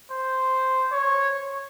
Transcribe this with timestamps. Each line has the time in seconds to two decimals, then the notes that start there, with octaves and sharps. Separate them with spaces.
0.11 C5
0.92 C#5